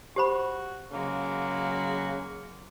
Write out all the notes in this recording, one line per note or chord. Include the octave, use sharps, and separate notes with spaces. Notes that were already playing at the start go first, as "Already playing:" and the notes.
F#4 G4 C5 B5
C#3 F#3 G#3 A#3 F#4